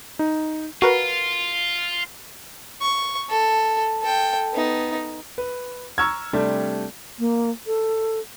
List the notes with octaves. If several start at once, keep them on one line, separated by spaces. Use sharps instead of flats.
D#4
F4 F#4 A#4 B4
C#6
A4
A4 G5
B3 D#4
B4
A#5 C#6 E6 F6 G#6
C3 G3 A3 C4 D4
A#3
A4